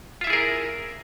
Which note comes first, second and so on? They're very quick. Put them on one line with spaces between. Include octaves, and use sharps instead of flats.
F4 E5 E4 G#4 A#4